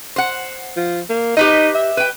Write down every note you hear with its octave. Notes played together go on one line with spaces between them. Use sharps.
C5 F#5
F3
A#3
D#4 G4 B4 D#5
E5
B4 G5